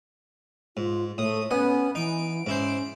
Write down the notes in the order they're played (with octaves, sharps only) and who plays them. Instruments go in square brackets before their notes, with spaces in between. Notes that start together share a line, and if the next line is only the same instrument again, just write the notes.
[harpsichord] G#2 [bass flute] F4
[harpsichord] A2 [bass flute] A3 [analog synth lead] D#6
[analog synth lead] B3 [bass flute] C#4 [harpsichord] F#5 G#5
[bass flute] E3 [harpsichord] D#4 [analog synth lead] D7
[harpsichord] G#2 E4 C5 [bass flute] C#4